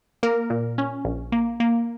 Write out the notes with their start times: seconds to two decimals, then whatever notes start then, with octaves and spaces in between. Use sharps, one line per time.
0.23 A#3 A#4
0.50 A#2
0.78 C#4
1.05 A#1
1.32 A#3
1.60 A#3